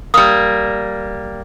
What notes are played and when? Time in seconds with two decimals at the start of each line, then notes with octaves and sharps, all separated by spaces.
0.14 G3 A#3 D#6